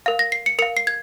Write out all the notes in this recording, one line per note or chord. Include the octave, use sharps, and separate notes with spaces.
A#4 F5
A#6
C7
C#7
A#4 F5 C#7
C7
G#6